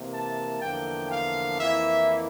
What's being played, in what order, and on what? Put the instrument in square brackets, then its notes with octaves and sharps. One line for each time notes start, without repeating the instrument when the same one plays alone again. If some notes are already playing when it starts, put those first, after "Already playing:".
Already playing: [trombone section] C3 E3 A#3
[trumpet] A5
[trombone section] E2 D3 F3 A#3 [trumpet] G5
[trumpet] F5
[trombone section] F2 E3 A#3 E4 [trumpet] E5